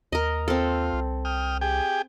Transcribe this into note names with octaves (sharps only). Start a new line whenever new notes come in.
D#2 A#4 D#5
C4 F4 A4
C2
G5 D#6 F6
G4 G#4 G5